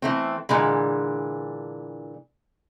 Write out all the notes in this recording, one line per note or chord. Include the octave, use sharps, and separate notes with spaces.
E3 A3 C4
A#2 D3 E3 G#3